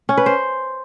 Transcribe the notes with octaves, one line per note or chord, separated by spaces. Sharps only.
C#4
B4
C5